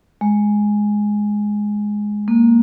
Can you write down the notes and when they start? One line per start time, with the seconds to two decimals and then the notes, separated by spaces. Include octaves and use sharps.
0.21 G#3
2.28 A#3